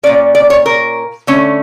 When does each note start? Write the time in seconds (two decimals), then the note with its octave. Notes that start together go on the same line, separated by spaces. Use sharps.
0.03 A#2 F3 C#4 D5
0.35 D5
0.50 C#5
0.66 A#4
1.27 D3 A3 C#4